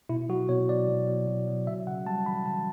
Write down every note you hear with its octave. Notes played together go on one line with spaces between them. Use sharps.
B2 E4
F#3 F#4
B2 C#5
F#3 D5
B2
F#3
B2
F#3
C#3 E5
C#3 F#5
G3 A5
E3 B5
C#3 A5